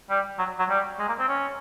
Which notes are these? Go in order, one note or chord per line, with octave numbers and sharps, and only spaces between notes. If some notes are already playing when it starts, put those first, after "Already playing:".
G3
F#3
F#3
G3
G#3
A#3
C4
C#4